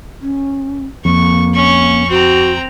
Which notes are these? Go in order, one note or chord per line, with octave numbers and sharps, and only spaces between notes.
C#4
F2 A#3 C#6
C#4 C#6
C4 F#4 A#5